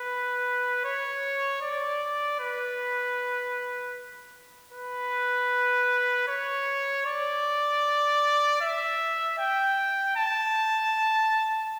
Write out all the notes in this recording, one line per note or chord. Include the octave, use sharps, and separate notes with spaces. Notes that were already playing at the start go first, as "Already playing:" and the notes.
Already playing: B4
C#5
D5
B4
B4
C#5
D5
E5
G5
A5